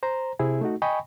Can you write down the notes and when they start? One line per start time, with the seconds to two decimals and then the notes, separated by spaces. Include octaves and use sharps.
0.03 C5 A#5
0.39 C3 C4 E4 G#4
0.61 A3 D#4 F#4
0.82 D#5 G5 G#5 B5 C#6